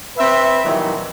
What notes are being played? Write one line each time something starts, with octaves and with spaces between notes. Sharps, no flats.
C4 B4 E5
A#2 D#3 E3 F#3 G3